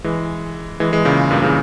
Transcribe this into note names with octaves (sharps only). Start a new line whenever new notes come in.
E3 G#3
E3 G#3
E3 G#3
A#2 C#3
G2 A#2
C#3 E3